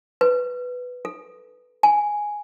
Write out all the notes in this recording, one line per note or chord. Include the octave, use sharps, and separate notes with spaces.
B4
A4
G#5